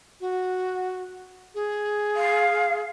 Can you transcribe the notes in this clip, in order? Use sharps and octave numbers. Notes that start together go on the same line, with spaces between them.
F#4
G#4
F5